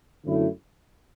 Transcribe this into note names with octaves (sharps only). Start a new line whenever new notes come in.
F#2 D3 A3 E4